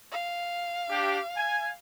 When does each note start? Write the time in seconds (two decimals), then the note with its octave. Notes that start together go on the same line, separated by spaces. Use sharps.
0.12 F5
0.90 D4 G4
1.37 G#5